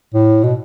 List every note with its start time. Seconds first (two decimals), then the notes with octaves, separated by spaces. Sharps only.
0.14 A2
0.44 B2